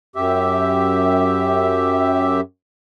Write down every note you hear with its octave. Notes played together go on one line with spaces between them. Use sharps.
F#2 G4 E5